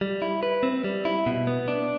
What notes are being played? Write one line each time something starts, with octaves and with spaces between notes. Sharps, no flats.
G3
E4
B4
C4
G3
E4
B2
B3
D4